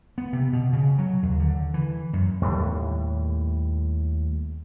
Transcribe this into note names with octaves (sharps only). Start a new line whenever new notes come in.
B3
C3
B2
C#3
F#3
D#2
D3
E3
F#2
D#2 A2 G3